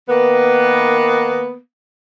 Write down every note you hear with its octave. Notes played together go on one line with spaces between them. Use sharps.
D#3 A#3 B3